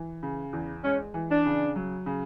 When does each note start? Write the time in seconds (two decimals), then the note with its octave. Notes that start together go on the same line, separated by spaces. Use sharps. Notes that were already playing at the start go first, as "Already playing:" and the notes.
Already playing: E3
0.23 C#3
0.53 E2
0.84 G#3 C#4
1.14 E3
1.30 D4
1.46 C#3
1.76 F#3
2.06 C#3